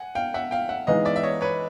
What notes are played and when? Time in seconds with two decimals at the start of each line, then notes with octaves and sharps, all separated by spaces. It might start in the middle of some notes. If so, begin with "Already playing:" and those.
Already playing: F#5 G#5
0.15 F5 G5
0.34 E5 F#5
0.51 F5 G5
0.69 E5 F#5
0.87 E3 G#3 B3 D#4 D#5 F5
1.05 D5 E5
1.16 E5
1.23 C#5 D#5
1.41 B4 C#5